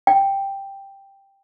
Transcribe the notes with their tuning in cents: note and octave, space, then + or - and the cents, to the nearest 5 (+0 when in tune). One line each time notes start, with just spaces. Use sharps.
G5 +5